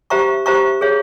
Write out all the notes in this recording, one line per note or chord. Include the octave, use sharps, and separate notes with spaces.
G4 C5 E5 A#5 C#6
G4 C5 E5 A#5 C#6
G#4 C#5 E5